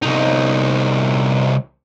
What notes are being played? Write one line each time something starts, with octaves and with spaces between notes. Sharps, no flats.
C2 D#4